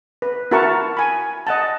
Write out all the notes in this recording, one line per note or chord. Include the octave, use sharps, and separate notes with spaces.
B4
E4 F#4 A#4 F#5 A5 C#6
G#5 B5
D#5 F#5 A5